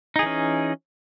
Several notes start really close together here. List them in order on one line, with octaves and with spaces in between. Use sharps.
D#4 G#4 E3 C#4